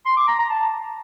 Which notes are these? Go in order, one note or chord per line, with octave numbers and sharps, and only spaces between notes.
C6
D6
A#5
A#5
A5